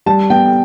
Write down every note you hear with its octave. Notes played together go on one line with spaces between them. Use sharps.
G3 A5
B3 G5